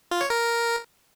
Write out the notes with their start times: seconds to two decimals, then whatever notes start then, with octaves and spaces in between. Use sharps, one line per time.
0.11 F4
0.21 C#5
0.30 A#4